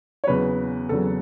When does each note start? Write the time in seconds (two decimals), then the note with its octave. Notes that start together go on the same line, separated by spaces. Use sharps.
0.24 C#5
0.27 E2 C#3 F#3 B4
0.89 E2 C#3 F#3 A4